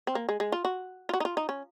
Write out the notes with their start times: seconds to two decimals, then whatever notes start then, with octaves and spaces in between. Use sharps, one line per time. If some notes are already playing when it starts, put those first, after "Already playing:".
0.07 C4
0.15 A#3
0.29 G#3
0.40 G#3
0.52 F4
0.65 F#4
1.09 F4
1.14 F#4
1.20 D#4
1.25 F4
1.37 D#4
1.49 C#4